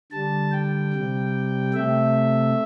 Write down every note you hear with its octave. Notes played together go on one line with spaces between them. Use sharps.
D3 G3 A5
G5
C3 G3
C3 A3 E5